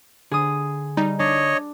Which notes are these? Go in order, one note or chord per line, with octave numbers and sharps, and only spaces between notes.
D3 G#4 D#6
G3 D#4
D4 C#5 D#5